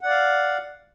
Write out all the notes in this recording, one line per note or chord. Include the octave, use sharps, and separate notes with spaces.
D5 F5 F#5